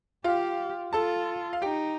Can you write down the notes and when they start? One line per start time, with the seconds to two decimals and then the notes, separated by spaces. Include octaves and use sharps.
0.24 F4 G4 F5
0.93 F4 A4 A5
1.53 F5
1.62 D#4 G4 G5